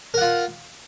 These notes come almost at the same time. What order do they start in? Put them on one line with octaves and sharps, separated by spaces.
A#4 F#5 F4